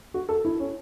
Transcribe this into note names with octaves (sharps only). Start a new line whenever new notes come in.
F#4
A4
E4
C#4